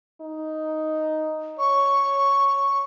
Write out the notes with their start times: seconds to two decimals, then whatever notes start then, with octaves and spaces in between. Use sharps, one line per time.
0.21 D#4
1.59 C#5 C#6